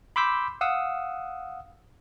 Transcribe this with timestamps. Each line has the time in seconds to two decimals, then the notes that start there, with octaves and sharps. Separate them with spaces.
0.16 B5 C6 D6 E6 G6 B6
0.61 F5 F#5 D#6 E6